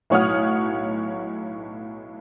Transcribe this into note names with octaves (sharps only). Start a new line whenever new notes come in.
B1 A2 C#5 F#5 D#6 F6